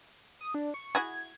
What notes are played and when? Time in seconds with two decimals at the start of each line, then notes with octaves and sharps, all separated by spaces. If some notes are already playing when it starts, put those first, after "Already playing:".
0.41 D#6
0.54 D4
0.74 C#6
0.95 E4 F#4 G#4 G#6